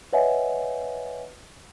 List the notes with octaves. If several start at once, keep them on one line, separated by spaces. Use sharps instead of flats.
B4 C#5 D#5 E5 F#5 G#5